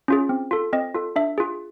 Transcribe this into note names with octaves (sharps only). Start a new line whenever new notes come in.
C#4 F4 G#4
C4
F4 A4
C4 D#5
F4 A4
D4 E5
F4 G#4